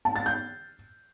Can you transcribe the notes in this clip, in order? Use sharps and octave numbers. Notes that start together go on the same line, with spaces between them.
A5
A6
G6